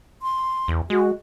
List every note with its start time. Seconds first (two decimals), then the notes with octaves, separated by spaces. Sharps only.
0.22 C6
0.68 E2
0.90 G#3 F#4